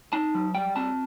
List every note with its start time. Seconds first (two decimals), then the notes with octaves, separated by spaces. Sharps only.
0.13 D#4 A5
0.35 F#3
0.55 G3 G5
0.76 C4 A5